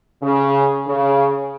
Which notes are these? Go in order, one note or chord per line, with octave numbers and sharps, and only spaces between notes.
C#3
C#3